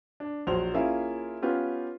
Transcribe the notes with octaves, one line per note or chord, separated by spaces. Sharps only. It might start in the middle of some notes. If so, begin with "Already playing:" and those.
D4
A#1 F#3 F#4 C5 F7
A#3 C#4 E4 F4 G#4 F5
B3 C#4 F4 G4